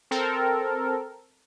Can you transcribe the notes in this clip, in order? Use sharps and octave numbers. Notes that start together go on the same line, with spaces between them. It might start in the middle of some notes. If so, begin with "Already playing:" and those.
C4 A4 A#4